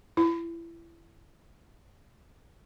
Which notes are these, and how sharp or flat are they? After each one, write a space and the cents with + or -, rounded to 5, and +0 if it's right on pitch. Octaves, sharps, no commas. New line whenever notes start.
E4 +25